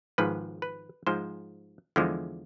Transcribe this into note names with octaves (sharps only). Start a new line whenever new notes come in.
G#1 G#2 F3 B4
B4
G#2 F3 G#3 C5
E2 D3 F3 G#3